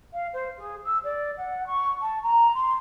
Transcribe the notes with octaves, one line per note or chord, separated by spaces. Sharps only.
F5
C5
G#4
E6
D5
F#5
C#6
A5
A#5
C6